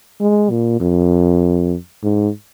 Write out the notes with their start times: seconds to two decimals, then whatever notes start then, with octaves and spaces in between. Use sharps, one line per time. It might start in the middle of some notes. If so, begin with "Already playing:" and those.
0.20 G#3
0.50 A#2
0.80 F2
2.03 G#2